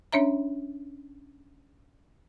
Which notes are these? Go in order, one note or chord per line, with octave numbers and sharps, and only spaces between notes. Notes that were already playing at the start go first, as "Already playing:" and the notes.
C#4 D4 C#5 E5 A#5